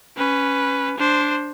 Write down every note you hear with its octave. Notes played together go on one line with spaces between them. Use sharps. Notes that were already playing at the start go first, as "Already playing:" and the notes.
C#4 B4
D4 C5